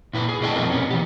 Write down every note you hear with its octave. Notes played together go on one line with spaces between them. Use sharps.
A#2 E4 B4
G#4
B2 A3 E4 D#5 G5 A5
F2 A#2 A3 C4 A#4
B2 B3 C#4
E3 G4